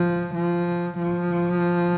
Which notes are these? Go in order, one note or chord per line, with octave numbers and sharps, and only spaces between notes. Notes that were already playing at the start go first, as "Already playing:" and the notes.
Already playing: F3
F3
F3